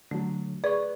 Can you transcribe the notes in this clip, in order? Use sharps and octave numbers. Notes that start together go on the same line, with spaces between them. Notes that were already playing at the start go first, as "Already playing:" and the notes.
D3 F#3 A3
G#4 B4 D5 C#6